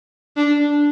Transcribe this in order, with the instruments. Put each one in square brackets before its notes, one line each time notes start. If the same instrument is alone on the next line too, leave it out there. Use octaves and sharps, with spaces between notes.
[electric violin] D4